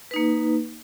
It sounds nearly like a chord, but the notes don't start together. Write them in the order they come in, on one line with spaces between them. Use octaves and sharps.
B4 D#4 A#3